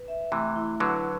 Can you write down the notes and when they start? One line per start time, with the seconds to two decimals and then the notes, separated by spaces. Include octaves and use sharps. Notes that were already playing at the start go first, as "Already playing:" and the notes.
Already playing: B4
0.08 E5
0.32 C3 E3 A3
0.56 E4
0.80 D3 F#3 B4